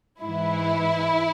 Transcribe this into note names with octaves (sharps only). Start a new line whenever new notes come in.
G#2 E3 E4